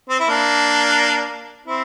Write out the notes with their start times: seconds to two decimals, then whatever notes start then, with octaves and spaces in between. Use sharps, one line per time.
0.09 C4
0.20 E4
0.29 A#3 D4
1.66 C4 E4